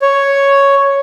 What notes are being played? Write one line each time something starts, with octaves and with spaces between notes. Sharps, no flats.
C#5